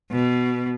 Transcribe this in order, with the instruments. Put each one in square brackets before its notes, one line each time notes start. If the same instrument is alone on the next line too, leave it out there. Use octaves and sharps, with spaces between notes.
[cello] B2